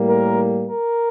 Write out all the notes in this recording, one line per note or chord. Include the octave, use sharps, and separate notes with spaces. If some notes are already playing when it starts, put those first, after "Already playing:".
Already playing: A2 G3 A#3
A#4
A#4